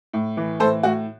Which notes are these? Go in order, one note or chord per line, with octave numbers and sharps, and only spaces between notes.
A2
E3
A2 A4 C5
A2 F#4